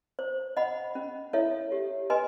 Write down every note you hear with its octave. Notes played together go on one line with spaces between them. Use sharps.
C5
D#5 F#5 B5
C#4
E4 A4 C#5 E5
G4
B4 D#5 G#5 C6